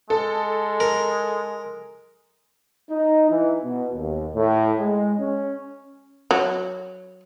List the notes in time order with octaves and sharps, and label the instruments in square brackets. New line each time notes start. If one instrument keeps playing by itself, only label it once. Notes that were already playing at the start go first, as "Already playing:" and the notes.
[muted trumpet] G#3 [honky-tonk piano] A4
[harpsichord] A#4
[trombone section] D#4
E3
B2
D#2
A2
G#3
C#4
[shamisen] F#3